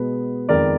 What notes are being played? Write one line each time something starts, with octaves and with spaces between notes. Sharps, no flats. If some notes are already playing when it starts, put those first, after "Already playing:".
Already playing: B2 G#3 B3 B4
F2 D#3 G#3 B3 A#4 D5